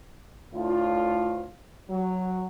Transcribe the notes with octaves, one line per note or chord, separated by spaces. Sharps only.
D2 A2 F4
F#3